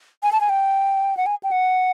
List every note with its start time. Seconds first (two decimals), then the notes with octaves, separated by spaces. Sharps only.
0.23 G#5
0.32 A5
0.41 G#5
0.49 G5
1.17 F#5
1.26 G#5
1.43 G5
1.51 F#5